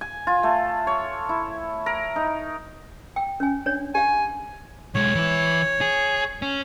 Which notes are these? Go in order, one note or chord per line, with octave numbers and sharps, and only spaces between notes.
G#5
F4
A3
C#5
E4
A#4
D#4
G5
C#4 G#5
D4 C#5
G4 F5 G#5
B1 G#3 C#5
E3 E4
G#4
C#4